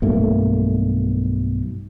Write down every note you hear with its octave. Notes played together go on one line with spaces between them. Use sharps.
B1 G2 A3 A#3